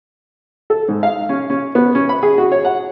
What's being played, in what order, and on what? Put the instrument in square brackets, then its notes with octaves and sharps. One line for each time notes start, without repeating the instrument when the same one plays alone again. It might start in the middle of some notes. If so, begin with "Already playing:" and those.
[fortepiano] A4
G#2
F5
C#4
C#4
B3
C#4
B5
G#4
F#4
C#5
F#5